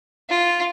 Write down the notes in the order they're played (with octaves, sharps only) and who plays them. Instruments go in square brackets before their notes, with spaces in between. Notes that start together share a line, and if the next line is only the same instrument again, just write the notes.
[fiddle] F4